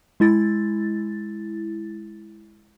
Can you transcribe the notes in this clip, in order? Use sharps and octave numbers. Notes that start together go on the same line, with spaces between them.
G#3 E4 A6